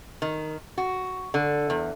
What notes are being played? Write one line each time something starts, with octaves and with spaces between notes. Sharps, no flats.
D#3
F#4
D3
E2